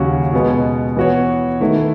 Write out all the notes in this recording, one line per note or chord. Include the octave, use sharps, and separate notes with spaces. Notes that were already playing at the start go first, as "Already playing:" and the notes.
Already playing: D#2 C#3 F#3 C#4 F#4
B2 G#3 B3
E3 B3 F#4 C#5
D#3 A3 E4 B4